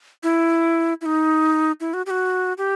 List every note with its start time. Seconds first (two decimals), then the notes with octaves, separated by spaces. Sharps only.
0.23 E4
1.01 E4
1.06 D#4
1.80 E4
1.94 F#4
2.06 G4
2.10 F#4
2.58 G4